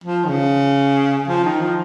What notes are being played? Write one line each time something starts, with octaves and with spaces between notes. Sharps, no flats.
F3
D#3
C#3
F3
D#3
F3